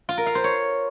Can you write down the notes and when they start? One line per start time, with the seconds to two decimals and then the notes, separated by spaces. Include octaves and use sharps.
0.09 F4
0.18 A#4
0.26 F5
0.35 C5
0.44 C#5